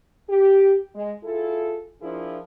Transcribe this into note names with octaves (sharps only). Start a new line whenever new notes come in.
G4
G#3
E4 F4 G#4 A4
F3 D4 E4 F4 G#4 A#4